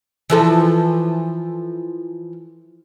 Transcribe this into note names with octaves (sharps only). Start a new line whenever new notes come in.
E3 F3 A4